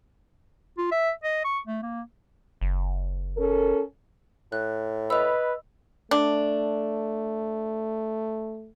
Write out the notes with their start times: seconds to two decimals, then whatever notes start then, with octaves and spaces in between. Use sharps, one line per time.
0.78 F4
0.92 E5
1.24 D#5
1.45 C#6
1.67 A3
1.83 A#3
2.61 F#1
3.37 C#4 A4 A#4
4.52 A2 F#6
5.10 B4 D#5 B5 E6
6.11 A3 D4